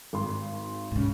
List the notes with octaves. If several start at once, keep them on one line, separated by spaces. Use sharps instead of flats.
G#1 C6
G#2 C#3